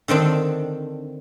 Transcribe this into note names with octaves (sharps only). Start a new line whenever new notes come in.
D3 D#3 C4 D4